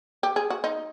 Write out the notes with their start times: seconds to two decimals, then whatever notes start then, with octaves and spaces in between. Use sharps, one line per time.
0.23 G4
0.36 G#4
0.50 F#4
0.64 D#4